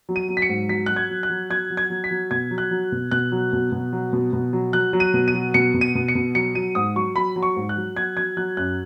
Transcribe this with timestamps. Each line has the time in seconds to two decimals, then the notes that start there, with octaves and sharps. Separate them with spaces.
0.09 F#3
0.16 D#7
0.29 F#3
0.37 B6
0.42 C#7
0.49 G#2
0.69 F#3 B6
0.86 F#3 F#6
0.96 G#6
1.09 F#3
1.23 F#6
1.30 F#3
1.51 F#3 G#6
1.70 F#3
1.77 G#6
1.90 F#3
2.04 B6
2.11 F#3
2.31 B2 G#6
2.51 F#3
2.58 F#6
2.71 F#3
2.92 B2
3.11 B2 F#6
3.32 F#3
3.53 B2
3.72 B2
3.93 F#3
4.13 B2
4.33 B2
4.53 F#3
4.73 F#3 F#6
4.93 F#3
5.00 D#7
5.14 B2
5.28 D#7
5.34 F#3
5.54 B2 C#7
5.74 B2
5.81 D#7
5.95 B2
6.08 C#7
6.15 B2
6.35 F#3 C#7
6.55 F#3 D#7
6.75 G#2 D#6
6.96 F#3 C#6
7.16 F#3 B5
7.36 F#3
7.43 C#6
7.56 G#2
7.69 F#6
7.77 F#3
7.96 F#3 G#6
8.17 F#3 G#6
8.37 F#3 F#6
8.57 F#2 F#6